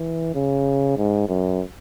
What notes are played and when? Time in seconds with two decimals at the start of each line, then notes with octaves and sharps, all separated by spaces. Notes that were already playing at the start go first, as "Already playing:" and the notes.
Already playing: E3
0.35 C#3
0.97 G#2
1.29 F#2